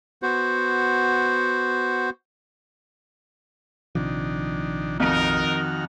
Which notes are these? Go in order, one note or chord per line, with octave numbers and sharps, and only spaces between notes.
B3 F#4 C5
A#1 C3 D#3 F3 D4
F2 D#3 D#4 F#4 A#4 F6